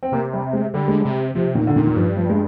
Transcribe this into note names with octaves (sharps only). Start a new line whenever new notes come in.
C4
C3 A#3
G3
G#3
D3 G3
G#3
C3 G3
C3 F3
A#2 D#3
D3
A#2 D#3
D#3
G2 F3
F3
G#3